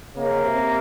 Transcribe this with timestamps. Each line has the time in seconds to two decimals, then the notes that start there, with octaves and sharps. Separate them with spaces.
0.16 C#3 A#3
0.45 C3